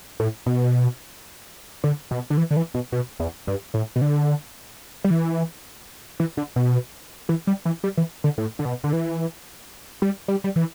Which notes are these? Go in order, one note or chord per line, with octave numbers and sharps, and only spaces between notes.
A2
B2
D3
B2
D3
E3
D3
E3
B2
B2
E2
G2
A2
B2
D3
G3
E3
E3
D3
B2
E3
G3
E3
G3
E3
D3
A2
D3
B2
D3
E3
G3
G3
G3
E3